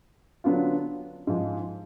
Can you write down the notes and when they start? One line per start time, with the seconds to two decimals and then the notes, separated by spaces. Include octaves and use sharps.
0.44 D3 F#3 B3 D4 F4
1.27 G#2 F3 G#3